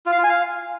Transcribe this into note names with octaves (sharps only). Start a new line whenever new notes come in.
F4
F5
F4
G#5
F5